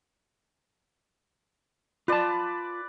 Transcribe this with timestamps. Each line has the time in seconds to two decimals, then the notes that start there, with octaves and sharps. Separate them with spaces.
2.08 F4 B4 D5 A5